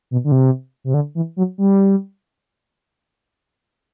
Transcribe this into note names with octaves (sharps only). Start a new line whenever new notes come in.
B2
D3
C3
C3
D3
E3
F#3
G3